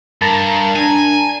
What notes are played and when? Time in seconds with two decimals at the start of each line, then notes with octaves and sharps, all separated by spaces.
0.22 G2 A#4 A5 A#5
0.76 D4 G#5